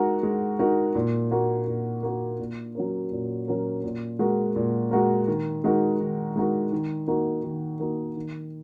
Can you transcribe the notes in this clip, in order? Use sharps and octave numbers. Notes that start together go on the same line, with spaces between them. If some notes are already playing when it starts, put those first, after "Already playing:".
Already playing: G#3 D#4 F#4 A#4
G#3
D#4 F#4 A#4
A#2
A#3 F#4 A#4
A#2
A#3 F#4 A#4
A#2
F#3 C#4 A#4
A#2
F#3 C#4 A#4
A#2
G#3 F#4 A#4
A#2
G#3 F#4 A#4
D#3
G#3 D#4 F#4 A#4
D#3
G#3 D#4 F#4 A#4
D#3
A#3 D#4 F#4 A#4
D#3
A#3 D#4 F#4 A#4
D#3